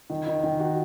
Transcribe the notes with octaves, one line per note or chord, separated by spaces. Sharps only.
D#3
D#3
D#3
F#4